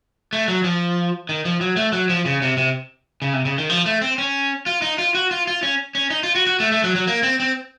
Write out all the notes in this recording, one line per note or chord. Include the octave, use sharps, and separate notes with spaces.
A3
F#3
F3
D#3
F3
F#3
A3
F#3
F3
C#3
C3
C3
C#3
C3
C#3
D#3
F3
A3
C4
C#4
F4
D#4
F4
F#4
F4
F4
C#4
C#4
D#4
F4
F#4
F#4
A3
A3
F#3
F#3
A#3
C4
C4